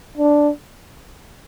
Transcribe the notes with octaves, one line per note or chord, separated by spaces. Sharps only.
D4